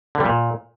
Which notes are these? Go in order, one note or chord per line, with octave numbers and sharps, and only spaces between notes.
D3
G3
A#2